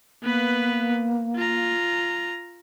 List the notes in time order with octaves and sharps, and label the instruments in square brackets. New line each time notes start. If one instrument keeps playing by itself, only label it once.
[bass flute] A#3 [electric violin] B3 B4
[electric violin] F4 A#5